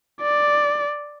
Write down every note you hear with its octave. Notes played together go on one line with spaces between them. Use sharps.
D5